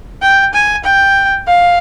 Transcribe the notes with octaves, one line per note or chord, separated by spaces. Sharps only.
G5
G#5
G5
F5